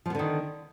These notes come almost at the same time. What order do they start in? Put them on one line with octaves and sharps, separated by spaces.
F3 B3 D3 D#3